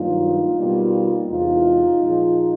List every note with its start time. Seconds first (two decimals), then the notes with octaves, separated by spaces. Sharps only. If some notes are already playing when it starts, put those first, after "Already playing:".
Already playing: G2 D#3 F#3 A#3 D#4 F4
0.57 B2 G3 A#3
1.29 E2 C3 E3 G#3 D#4 F4
2.01 A#2 F3 G#3